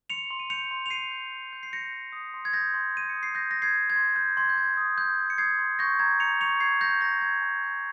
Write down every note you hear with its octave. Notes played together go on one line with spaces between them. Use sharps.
C6 C#7 F7
C6
D#7
G6 C#7 F7
C6
F7
C6 C7 D#7
G6
G6
G6
C7
G6 A#6 C#7
G6
D#6
C6
G#6
D#6 G6 A#6
C6
C6 D#7
D#6 C#7
C7
D#6 G6 A#6
D#6 A#6
G#6 C7
G6
G#6
C6
G6
C6 G#6
G6
C6 G#6
D#6
C6 G6
C6
C#7
D#6 G#6 C7
C6
C#6 G6 A#6
A#5 G#6
A#5 C#7 F7
C#6 C#7 F7
G6 G#6 C7
G6 A#6
A#5 G6 A#6
A#5 G#6
G#5
G6